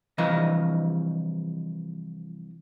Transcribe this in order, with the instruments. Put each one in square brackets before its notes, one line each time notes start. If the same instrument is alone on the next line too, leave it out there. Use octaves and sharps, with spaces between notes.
[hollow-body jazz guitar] C2 E3 F3 D#5